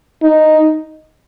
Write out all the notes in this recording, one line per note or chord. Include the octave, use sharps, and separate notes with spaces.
D#4